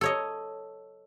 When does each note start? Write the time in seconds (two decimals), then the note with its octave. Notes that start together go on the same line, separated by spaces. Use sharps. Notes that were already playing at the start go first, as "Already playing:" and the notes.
0.01 A4 C#5 D#5